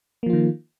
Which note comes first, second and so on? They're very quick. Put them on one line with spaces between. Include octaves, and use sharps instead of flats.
A#3 F3 F4 D#3